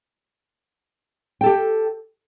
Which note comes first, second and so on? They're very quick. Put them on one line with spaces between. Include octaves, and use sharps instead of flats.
G5 A4 G4